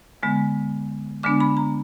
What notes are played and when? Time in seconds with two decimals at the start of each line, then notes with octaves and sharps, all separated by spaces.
0.23 D3 G#3 B3
1.23 D3 G#3 B3 D4 D6
1.40 B5
1.57 A#5